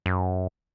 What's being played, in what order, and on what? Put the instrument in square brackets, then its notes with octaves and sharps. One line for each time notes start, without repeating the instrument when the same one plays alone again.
[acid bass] F#2